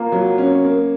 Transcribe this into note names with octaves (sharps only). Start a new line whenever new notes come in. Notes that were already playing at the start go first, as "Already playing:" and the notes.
Already playing: A#3 F4
F#3
C#4
A#3